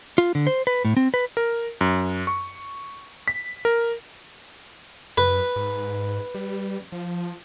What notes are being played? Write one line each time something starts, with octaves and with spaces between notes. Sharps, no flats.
F4
D3
C5
B4
A2
C4
B4
A#4
F#2
C#6
B6
A#4
F#2 B4
G#2
G3
F3